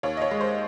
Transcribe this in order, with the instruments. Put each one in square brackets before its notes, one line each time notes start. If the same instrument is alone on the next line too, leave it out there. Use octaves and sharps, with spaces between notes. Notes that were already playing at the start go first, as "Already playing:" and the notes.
[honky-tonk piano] D#2 C#5
D#5
C#5
G#3
C5